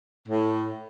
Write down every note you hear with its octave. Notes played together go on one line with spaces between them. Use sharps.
A2